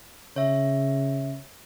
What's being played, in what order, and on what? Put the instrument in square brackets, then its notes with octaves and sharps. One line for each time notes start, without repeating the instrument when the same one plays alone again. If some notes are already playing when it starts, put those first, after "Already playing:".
[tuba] C#3 [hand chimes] C#5 E5